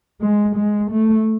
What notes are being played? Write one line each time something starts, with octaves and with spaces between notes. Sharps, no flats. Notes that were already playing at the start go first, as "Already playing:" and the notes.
G#3
G#3
A3